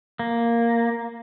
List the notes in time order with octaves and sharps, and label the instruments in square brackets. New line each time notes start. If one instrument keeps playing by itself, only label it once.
[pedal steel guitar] A#3